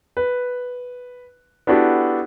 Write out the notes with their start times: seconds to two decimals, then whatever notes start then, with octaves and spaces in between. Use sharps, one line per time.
0.17 B4
1.67 B3 D4 E4 F#4 G4 A4